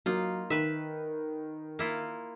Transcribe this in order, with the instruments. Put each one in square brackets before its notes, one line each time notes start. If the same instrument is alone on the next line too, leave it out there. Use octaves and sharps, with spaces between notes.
[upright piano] F#3 [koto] A#3 D#4 F4
[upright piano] D#3 [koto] B4 E5
[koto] A#3 E4 F4